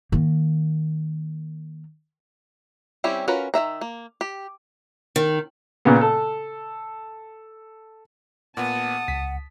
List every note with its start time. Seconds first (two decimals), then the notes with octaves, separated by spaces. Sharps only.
0.12 D#3 A#3
3.04 G3 C4 C#4 E4 G4
3.28 C#4 F4 F#4 A#4 B4
3.54 D#3 F#4 E5 A#5
3.81 A#3
4.21 G4
5.16 D#3
5.85 A#2 C#3 B3
6.01 A4
8.57 A#2 B3 F#5 A5 D#6
9.08 C#2 B6